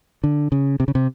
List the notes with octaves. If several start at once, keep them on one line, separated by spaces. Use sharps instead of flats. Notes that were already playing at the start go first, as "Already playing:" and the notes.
D3
C#3
C3
C#3
C3